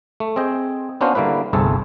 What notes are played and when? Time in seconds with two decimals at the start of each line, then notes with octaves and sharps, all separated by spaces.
0.20 A3
0.36 C4 G#4 D#5 G5
1.01 B3 C#4 D4 F#4 C5 F5
1.15 D3 G3 A#3 E4 B4
1.53 G1 C2 A3 C4 G#4 A4